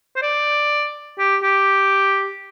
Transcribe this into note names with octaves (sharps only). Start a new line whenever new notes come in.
C5
D5
G4
G4